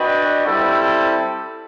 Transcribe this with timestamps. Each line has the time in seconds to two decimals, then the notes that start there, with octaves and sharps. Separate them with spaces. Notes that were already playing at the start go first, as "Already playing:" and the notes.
Already playing: D4 F#4 B4 D#5 G5
0.46 G3 C4 E4 A4